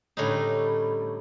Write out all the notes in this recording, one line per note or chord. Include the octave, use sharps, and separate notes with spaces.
A2 D3 G3 C#4 D#4